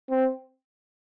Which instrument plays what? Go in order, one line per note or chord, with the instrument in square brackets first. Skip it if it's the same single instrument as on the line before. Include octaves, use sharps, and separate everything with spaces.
[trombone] C4